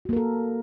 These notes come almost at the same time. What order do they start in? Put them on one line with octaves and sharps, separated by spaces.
F#4 A#3 A#4 A4